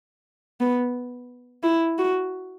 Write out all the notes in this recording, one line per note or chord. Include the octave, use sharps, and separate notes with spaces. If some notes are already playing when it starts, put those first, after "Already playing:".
B3
E4
F#4